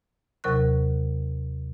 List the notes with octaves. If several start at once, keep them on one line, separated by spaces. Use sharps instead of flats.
D#2 C3 F#3 A#4 C#6 F#6